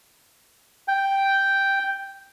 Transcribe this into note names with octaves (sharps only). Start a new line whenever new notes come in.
G5